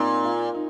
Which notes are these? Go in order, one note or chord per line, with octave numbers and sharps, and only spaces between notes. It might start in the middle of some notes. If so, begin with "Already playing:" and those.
Already playing: A#2 A#3 C4 D#4
F4
D#4